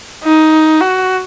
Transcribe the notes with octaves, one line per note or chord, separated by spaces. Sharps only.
D#4
F#4